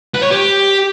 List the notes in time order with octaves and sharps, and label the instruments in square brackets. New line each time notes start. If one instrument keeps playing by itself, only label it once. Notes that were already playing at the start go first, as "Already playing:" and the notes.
[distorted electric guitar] B4
C#5
G4